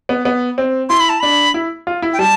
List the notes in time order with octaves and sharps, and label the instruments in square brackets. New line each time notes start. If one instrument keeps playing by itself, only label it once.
[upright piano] B3
B3
C4
[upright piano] E4 [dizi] C6
[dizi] B5
A5
[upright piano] D4 [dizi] B5
[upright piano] E4
F4
E4
[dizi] G5
[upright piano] G3 [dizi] A5